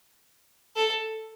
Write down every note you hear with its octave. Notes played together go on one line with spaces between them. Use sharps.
A4